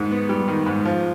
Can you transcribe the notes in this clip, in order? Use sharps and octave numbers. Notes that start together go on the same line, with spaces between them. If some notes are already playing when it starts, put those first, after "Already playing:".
Already playing: G#2 D#3
B3
G3
D#3
G#2
F3